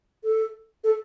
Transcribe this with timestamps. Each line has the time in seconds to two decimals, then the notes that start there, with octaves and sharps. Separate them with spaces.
0.23 A4
0.84 A4